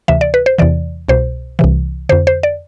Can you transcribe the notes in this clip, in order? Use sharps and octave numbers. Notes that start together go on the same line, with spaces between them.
D2 C3 E3 E5
D5
B4
C5
E2 C3 E3 D5
C2 B2 C5
C2 C3 E3
F2 D3 C5
C5
D5